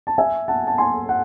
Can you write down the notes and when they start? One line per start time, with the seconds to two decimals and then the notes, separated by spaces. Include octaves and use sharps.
0.07 A5
0.18 E5 G#5
0.48 F#5 A5
0.67 A5
0.78 G#5 C6
1.09 F#5